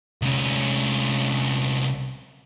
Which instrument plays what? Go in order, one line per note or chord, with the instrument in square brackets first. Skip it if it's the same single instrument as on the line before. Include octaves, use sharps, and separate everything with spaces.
[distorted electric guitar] C2 C#4